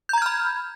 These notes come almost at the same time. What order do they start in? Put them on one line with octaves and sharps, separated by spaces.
G6 A#5 G#6 F6 B5